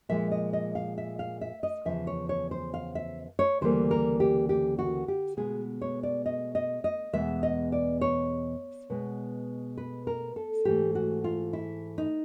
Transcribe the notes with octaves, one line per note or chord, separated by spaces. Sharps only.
A#2 F3 G#3 E5
D#5
D#5
F5
E5
F5
E5
D#5
E2 C#3 F3 E5
C#5
C#5
C5
F5
E5
C#5
D2 C#3 E3 G3 A#3 C5
A#4
G4
G4
F#4
G4
B2 G#3 B3 G#4
C#5
D5
D#5
D#5
D#5
E2 B2 G#3 B3 E5
D#5
D5
C#5
B2 G#3 B3
B4
A#4
A4
G#2 E3 A3 G4
F#4
F4
E4
D#4